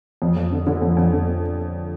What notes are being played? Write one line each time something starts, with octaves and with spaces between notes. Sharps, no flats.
F2
F2
D3
D3
F2
F2
D3